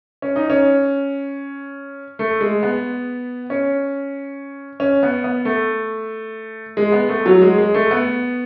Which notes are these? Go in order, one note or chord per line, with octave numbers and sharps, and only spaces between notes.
C#4
D#4
C#4
A3
G#3
B3
C#4
C#4
B3
B3
A3
G#3
B3
A3
F#3
G#3
G#3
A3
B3